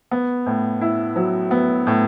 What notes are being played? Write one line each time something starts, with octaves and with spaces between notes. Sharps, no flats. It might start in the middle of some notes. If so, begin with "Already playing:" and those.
B3
A2
E4
F#3
B3
A2